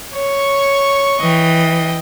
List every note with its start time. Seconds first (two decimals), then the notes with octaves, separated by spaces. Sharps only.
0.13 C#5 C#6
1.20 E3 D#5 G5